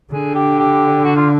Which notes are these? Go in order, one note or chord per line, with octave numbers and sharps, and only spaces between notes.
D3 G#4
G4
G4
F#4
F4